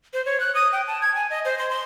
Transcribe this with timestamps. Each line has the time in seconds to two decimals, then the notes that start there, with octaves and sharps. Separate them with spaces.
0.14 C5
0.26 C#5
0.40 F#6
0.55 D#6
0.72 G5
0.87 A5
1.02 G#6
1.15 G#5
1.30 D#5
1.45 C5
1.59 C6
1.70 C6